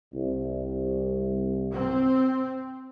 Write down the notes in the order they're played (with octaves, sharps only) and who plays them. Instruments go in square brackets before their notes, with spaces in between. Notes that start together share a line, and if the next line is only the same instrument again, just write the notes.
[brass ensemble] C2
[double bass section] C4